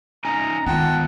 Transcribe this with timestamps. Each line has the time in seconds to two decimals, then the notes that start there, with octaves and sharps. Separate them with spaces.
0.25 C#4 D#4 G#5 A#5
0.66 C#2 D#3 B3 F4 F#5 G5 A5